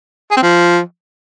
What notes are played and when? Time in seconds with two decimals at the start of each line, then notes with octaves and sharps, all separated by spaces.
0.31 G#4
0.37 C4
0.43 F3